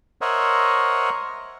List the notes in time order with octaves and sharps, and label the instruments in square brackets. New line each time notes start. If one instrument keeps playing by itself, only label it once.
[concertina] A#4 C5 C#5 D#5 E5 F#5